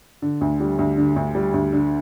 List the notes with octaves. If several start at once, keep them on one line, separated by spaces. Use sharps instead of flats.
D3
D2
G3
D2
D3
D2
G3
D2
D3